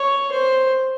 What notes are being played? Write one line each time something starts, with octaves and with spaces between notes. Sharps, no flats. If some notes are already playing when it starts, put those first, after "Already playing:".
Already playing: C#5
C5